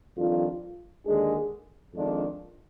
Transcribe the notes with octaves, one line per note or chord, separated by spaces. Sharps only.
F2 D#3 G3 D4 F4
D#2 D3 G#3 D4 G#4
F2 D#3 G#3 D4 F4